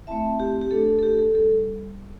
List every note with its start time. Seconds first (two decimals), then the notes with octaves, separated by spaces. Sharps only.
0.07 A3 C4 E4 E5 A5
0.40 G4
0.61 G4
0.71 A3 D4 A4
0.99 A4
1.03 G4
1.18 A4
1.35 G3 A4